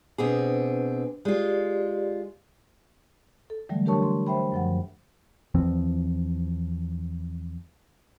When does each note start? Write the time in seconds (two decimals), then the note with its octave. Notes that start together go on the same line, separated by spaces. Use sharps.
0.18 B2 C4 D4 G#4 B4
1.25 G#3 F4 G4 D5
3.50 A4
3.69 D3 E3 F#3 G3 A3
3.86 D4 G4 A#4 C#5 A5 C#6
4.03 C6
4.27 C5 E5 G5 B5
4.52 F#2 F3 F#5
5.54 E2 E3 F3 C4